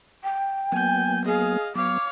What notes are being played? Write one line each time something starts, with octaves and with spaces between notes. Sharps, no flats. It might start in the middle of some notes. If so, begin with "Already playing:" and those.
G5
F#3 A#3 B3 G#5 G6
G#4 D#5 F5
F#3 B3 C#5 F5 D6